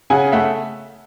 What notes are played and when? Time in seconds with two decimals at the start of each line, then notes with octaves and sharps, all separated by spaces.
0.10 C#3 F#5 G#5
0.32 A3 E5 F#5